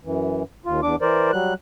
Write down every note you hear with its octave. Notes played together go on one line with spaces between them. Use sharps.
F#2 E3
D#2 F4
E2 D4 D6
E3 A#4 C5 D5
F#3 G3 F#6